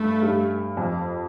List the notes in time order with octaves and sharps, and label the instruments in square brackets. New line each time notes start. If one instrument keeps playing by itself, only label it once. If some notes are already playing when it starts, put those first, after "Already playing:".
Already playing: [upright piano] G2 [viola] A3
[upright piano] G2
F2